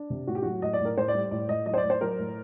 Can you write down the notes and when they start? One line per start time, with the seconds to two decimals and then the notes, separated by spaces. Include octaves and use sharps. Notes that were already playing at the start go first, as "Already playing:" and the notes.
Already playing: D4
0.10 C3
0.27 A2 F#4
0.35 G4
0.42 F#3 F#4
0.62 A2 D#5
0.73 D5
0.80 A2
0.85 A#4
0.97 A2 C5
1.08 D5
1.15 G3
1.31 A2 D5
1.49 A2 D#5
1.66 F#3 D#5
1.74 C5
1.78 D5
1.84 A2
1.90 C5
2.01 F#3 A#4
2.19 A2